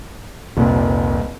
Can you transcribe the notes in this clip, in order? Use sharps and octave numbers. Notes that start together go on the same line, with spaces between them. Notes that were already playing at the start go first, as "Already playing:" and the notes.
F1 C2 A#2